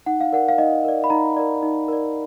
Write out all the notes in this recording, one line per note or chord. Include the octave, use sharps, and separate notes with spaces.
D#4 F#5
F5
A#4 D5 F#5
F5
D#4 D#5
A#4 D5
B5
D#4 A#5
A#4 D5
D#4
A#4 D5